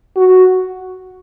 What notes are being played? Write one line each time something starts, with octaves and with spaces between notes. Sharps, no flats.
F#4